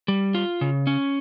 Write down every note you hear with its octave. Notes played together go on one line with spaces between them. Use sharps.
G3
F4
C#3
C#4